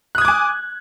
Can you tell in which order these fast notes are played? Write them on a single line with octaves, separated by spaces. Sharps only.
F#6 D#6 G#6 D6 G#5